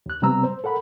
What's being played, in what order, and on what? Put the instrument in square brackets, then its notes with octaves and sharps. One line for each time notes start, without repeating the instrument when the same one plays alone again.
[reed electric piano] D#2 F#6
C3 G3 B3 C4 A#5 E6
C5
A4 A#4 F#5 B5